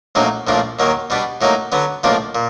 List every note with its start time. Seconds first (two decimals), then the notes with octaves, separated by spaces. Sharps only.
0.15 A#1 A2 F#3 A#3 D#4
0.47 A#1 A2 F3 A#3 D4
0.79 D#2 D#3 F#3 A#3
1.10 B2 G3 B3 D4
1.41 A2 F#3 A#3 D#4
1.72 D3 F#3 B3
2.03 B1 A2 F3 A#3 D4
2.35 A#2